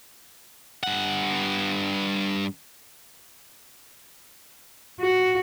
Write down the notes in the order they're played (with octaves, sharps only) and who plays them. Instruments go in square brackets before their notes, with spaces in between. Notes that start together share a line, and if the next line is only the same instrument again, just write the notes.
[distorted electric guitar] G2 F#5
[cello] F#4